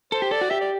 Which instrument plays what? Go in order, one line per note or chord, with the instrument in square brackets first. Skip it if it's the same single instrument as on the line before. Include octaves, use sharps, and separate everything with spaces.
[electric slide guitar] A4 [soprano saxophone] C5
[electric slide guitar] G4
[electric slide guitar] A4 [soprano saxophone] D5
[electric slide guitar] F#4
[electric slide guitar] G4 [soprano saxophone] E5
[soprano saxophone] D5